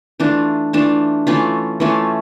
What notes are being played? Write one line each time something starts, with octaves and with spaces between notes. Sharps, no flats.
E3 A3 D4 F4
E3 A3 D4 F4
E3 A3 C#4 F4
E3 A3 C#4 F4